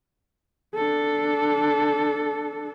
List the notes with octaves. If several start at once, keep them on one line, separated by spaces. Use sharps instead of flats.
D4 A4